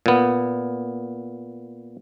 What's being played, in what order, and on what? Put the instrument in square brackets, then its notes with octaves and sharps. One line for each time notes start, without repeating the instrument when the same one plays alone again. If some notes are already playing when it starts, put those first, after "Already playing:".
[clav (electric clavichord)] A#2 B3